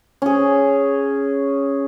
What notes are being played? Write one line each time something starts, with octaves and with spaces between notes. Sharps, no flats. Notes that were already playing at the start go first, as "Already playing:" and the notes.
C#4 G#4